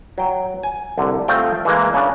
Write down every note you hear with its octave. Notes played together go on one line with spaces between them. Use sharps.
F#3 G5
G#5
C2 D3
A3 C4 F4 D#5 G5
E3 G#3 A#3
C#3 D4